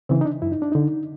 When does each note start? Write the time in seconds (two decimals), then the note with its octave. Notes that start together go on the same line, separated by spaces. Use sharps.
0.09 C#3 E3 C4
0.21 D#4
0.25 D4
0.42 F#2 E4
0.52 D#4
0.62 D4
0.72 D3 D#4